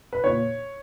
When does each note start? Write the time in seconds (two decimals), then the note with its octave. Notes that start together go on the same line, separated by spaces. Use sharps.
0.13 B4
0.24 A#2 C#5